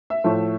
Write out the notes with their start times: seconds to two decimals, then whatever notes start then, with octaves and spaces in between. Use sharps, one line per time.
0.10 E5
0.24 A2 F3 A3